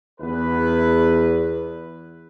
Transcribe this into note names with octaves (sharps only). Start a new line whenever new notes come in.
E2 B4